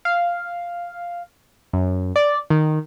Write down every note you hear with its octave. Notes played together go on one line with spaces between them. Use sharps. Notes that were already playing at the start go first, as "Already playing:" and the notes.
F5
F#2
D5
D#3